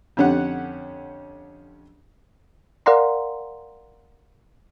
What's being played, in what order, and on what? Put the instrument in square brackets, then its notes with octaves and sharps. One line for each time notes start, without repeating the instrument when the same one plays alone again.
[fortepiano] F2 D3 C#4 G4 F#5
[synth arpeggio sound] A#4 D5 F5 F#5 A#5 C6